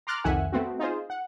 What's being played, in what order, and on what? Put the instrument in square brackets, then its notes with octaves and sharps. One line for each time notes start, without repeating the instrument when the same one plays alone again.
[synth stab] A#5 C6 D6 F6 F#6 A6
C2 F2 D#3 E5 F#5 G#5
A3 B3 C4 F#4
D#4 F4 G#4 C5
F#5